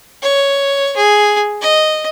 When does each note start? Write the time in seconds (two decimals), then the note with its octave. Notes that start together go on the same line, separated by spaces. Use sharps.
0.23 C#5
0.97 G#4
1.61 D#5